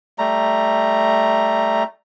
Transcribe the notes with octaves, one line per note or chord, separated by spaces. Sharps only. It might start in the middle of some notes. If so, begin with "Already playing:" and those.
G3 A3 A#5